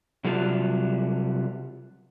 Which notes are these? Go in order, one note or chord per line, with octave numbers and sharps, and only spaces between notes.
C3 F#3 G3 F4 F#4